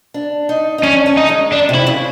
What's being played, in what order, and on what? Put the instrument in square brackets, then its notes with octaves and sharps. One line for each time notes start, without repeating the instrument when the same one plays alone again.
[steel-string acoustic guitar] D4
D#4
D#4
[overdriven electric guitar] C#4 [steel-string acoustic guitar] D4
[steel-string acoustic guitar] C#4
[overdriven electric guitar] D#4
[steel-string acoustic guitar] G#3
[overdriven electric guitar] D4
[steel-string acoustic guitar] C3
[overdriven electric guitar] E4
[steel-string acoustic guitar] C#3